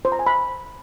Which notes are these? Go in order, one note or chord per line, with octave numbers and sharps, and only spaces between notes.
C5
A#5
G#5
B5